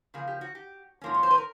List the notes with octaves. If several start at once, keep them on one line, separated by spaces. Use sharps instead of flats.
C#3 F3 A#3 G#4
G4
F#4
G4
G#2 F3 A#3 C#4
C#5
C5
B4
A#4